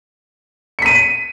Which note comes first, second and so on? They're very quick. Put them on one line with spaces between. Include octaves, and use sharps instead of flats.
C#7 B6 D#7